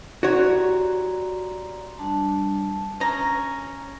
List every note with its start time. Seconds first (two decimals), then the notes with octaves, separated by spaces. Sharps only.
0.23 F#4 G4 C#5 D5 A#5 C6
1.98 G3 D4 A5
3.00 C#4 A#5